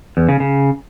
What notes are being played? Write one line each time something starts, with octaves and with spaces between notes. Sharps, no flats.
E2
C#3
C#3